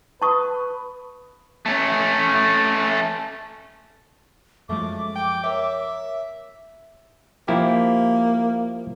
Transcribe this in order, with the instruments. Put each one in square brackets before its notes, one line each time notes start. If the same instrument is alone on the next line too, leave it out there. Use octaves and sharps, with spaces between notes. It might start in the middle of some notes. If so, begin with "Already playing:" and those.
[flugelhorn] B4 [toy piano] A5 C#6 D#6
[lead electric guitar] A3 C#4
[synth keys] F#2 F3 G#3 [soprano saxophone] A3 [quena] D6
[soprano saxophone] G5
[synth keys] A#4 C#5 [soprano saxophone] E5
[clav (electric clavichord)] F3 E4 G4 [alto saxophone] A#3